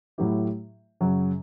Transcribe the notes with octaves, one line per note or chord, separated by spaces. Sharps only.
A2 F#3 A3 E4 G4
F#2 C#3 F#3